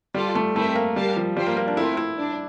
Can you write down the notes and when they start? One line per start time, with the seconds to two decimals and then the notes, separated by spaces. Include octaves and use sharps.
0.15 G3 F4 A4 D5
0.35 A3
0.56 A3 C4 E4 A#4 E5 G5
0.75 A#3
0.96 G3 G4 A#4 F5 A5
1.17 F3
1.37 G3 F4 C5 G5
1.46 A#3
1.57 A#3
1.67 D4
1.76 A3 C4 E4 F4 A#4
1.97 E4
2.17 D4